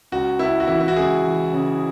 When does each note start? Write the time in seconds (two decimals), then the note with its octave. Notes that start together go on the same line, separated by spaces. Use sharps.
0.12 C#2 F#4
0.39 C#2 E4
0.60 F#4
0.68 E3 E4
0.80 E4
0.88 F#4
0.96 C#2 G#4
1.25 E3
1.53 C#3